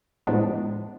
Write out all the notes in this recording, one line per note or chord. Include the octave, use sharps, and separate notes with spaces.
A2 F3 G#3 B3 D4